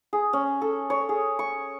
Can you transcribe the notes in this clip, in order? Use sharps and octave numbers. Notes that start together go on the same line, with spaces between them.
G#4
C#4
A4
C#5
G#4
C#6